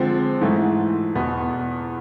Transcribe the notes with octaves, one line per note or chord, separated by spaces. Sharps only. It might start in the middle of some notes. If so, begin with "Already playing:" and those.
Already playing: D3 F3 G#3 C4
G#2 E3 A3
E2 B2 B3